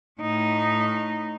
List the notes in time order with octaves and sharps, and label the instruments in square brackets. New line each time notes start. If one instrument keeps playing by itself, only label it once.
[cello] A2 D#4